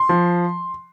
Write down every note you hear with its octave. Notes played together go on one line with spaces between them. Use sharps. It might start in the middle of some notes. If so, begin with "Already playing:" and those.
Already playing: C6
F3